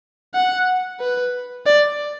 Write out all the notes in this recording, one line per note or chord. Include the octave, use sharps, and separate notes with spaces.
F#5
B4
D5